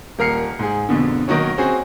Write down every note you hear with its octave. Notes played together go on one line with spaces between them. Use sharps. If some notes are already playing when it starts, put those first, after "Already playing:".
D#1 A#4 F6 C7 C#7
G#2 G#4
F2 B2 D3
B1 D#3 D#4 F#4 C#5
C4 C#4 F#4 G#4 C5